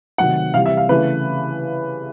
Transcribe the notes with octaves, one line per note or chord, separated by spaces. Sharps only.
C3 D#3 F#3 A3 F#5
C3 E3 G3 F5
E5
F5
C#3 E3 A3 B4